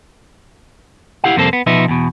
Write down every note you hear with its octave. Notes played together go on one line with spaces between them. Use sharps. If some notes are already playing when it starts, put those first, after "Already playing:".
E4 G4 F5 F#5
F2 C3 G3 A#3 A4 C5
B3
B2 F3 D#4 B4 E5
E2 B2